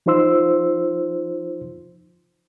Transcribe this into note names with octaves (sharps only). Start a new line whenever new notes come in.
F3 D#4 F4 C5 C6 E6